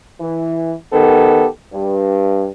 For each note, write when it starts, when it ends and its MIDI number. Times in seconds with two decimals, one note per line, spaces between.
0.20 0.73 52
0.92 1.47 51
0.92 1.47 59
0.92 1.47 67
0.92 1.47 69
1.73 2.47 43